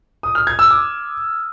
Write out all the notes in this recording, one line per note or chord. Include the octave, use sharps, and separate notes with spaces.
D#6
F6
G#6
E6
D6